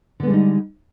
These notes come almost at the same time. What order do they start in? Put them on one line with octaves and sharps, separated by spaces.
D3 B3 G#3 G3 D#4